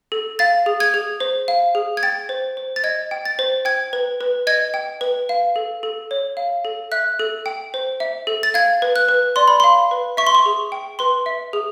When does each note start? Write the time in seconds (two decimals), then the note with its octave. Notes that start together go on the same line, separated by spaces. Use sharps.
0.12 A4
0.39 F5 A6
0.66 G#4
0.80 G#6
0.94 G#4
1.20 C5
1.48 F5
1.75 G#4
1.97 G#6
2.03 G5 A6
2.29 C5
2.57 C5
2.76 A6
2.84 D#5 G#6
3.11 G5
3.25 A6
3.39 C5
3.65 G5 G#6
3.93 B4
4.21 B4
4.47 D#5 G#6
4.74 G5
5.01 B4
5.29 F5
5.56 A4
5.83 A4
6.11 C#5
6.37 F5
6.65 A4
6.92 E5 F#6
7.20 A4
7.46 G5
7.74 C5
8.00 E5
8.27 A4
8.43 A6
8.54 F5 G#6
8.82 B4
8.96 F#6
9.09 B4
9.36 D5 C6
9.48 B5
9.60 F5 C6
9.91 B4
10.17 E5 C#6
10.27 C6
10.35 C#6
10.46 G#4
10.72 G5
10.99 B4 C6
11.26 E5
11.53 G#4